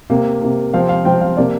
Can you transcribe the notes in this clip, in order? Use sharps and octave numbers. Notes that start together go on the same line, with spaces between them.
C3 A#3
C3 A#3
C3 F3 C4 F5
F5
C3 F3 C4 G5
F5
C3 A#3 D5